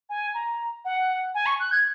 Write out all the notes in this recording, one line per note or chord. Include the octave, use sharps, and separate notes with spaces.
G#5
A#5
F#5
G#5
C#6
F#6
G#6